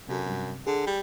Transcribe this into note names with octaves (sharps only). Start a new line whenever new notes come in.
F#2 C3 F#4 A4
G2 C3
D3 G#4
G3